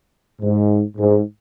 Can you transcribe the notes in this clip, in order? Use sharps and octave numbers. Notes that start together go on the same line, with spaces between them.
G#2
G#2